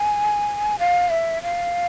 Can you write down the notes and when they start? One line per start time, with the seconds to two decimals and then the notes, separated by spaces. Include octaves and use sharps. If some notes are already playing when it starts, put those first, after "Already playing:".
Already playing: G#5
0.79 F5
1.10 E5
1.43 F5